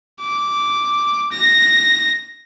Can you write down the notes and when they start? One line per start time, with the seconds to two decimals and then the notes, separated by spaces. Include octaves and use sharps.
0.21 D6
1.32 A#6